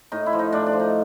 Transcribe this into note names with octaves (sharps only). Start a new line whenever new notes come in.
A2 D#4
E4
F3
D#4
A2 D4
D4
F3
D#4